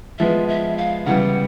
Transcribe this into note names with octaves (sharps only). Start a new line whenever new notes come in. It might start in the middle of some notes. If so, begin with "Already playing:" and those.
F3 G#3 B3 E5
E5
F5
C#3 E3 G3 B3 F#5